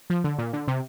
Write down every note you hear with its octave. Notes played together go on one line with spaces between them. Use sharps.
F3
D3
A#2
D3
C3